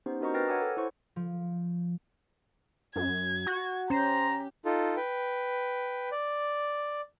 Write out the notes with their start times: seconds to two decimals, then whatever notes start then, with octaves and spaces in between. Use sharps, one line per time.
0.06 B3 C#4 D#4 G4 C5
0.21 D4 F#4 A#4 D#5 A#5 C#6
0.34 A#4 B4 G5 F6 A6 A#6
0.48 C#5 F#5 G#5 D6 E6
0.62 A4
0.77 E4 C5 C#6
1.16 F3
2.96 F#2 G#6
3.46 F#4
3.90 C#4 G4 C5 A#5
4.65 D#4 F4 A4
4.96 B4 G5
6.12 D5